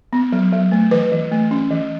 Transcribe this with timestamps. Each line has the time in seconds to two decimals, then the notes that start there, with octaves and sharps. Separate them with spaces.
0.13 B3
0.32 F#3
0.52 F#3
0.72 A3
0.91 E3 B4
1.12 E3
1.31 A3
1.51 C#4
1.71 E3